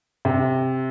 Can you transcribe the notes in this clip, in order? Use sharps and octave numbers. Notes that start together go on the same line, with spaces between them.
C3